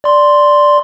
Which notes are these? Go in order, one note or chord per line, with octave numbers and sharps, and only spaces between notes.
D5 C6